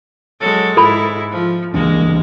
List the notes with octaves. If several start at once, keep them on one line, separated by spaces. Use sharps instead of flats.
F#3 G#3 A4
G#2 E4 A4 B5
F3
C#2 E3 G#3 A#3 D4